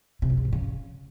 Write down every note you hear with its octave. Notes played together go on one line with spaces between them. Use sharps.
C3
F#2
F2
G#2
C#3